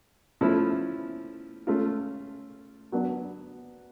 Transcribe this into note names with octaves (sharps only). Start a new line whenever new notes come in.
F3 A3 C#4 E4
A3 C#4 F4
F#3 B3 D4